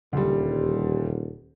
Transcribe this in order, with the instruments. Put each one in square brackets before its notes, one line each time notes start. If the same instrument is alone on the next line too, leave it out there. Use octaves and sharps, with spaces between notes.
[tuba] D#1 [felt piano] D2 G3